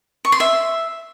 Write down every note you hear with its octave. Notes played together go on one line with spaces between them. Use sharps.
C#6
C6
E5